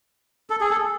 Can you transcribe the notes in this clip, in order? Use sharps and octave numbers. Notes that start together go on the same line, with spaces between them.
A4
G#4
A4